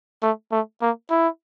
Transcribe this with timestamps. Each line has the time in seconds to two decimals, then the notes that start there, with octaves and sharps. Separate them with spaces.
0.23 A3
0.52 A3
0.82 A#3
1.10 E4